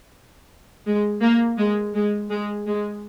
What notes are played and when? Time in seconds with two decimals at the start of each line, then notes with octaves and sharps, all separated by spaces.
0.86 G#3
1.22 A#3
1.58 G#3
1.94 G#3
2.30 G#3
2.66 G#3